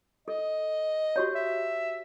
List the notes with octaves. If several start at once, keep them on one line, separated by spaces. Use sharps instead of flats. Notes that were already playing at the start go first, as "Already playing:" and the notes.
A4 D#5
F#4 G4 C#5
E5